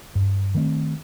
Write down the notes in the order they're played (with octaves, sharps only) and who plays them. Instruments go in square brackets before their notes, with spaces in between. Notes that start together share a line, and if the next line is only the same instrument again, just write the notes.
[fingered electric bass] G2
D#3 A3 C4